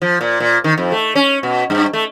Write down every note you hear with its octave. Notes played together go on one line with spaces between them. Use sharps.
F3
A#2
A#2
D#3
F2
A3
C#4
B2
G2
A3